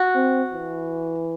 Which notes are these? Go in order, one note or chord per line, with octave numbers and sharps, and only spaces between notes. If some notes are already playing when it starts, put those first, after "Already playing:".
Already playing: F#4
C4
E3